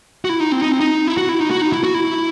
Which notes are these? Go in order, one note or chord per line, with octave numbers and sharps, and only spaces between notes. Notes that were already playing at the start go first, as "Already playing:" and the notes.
F#4
E4
D#4
C4
D#4
C4
D#4
E4
F#4
E4
D#4
F#4
D#4
E4
F#4
E4